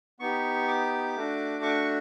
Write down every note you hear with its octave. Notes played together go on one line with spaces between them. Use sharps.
B3 D#4 G4 C#6
D6
A3 D4 F#4
C#6